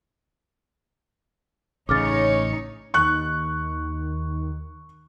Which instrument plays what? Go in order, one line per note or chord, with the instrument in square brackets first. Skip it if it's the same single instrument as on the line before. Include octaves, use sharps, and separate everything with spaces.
[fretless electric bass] A1 C#3 [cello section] D#4 C#5 [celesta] D6 F6 A6
[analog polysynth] D#2 D#3 [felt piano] C#6 F#6